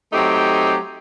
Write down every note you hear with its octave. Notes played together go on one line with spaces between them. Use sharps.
F#3 A3 C4 D#4 G4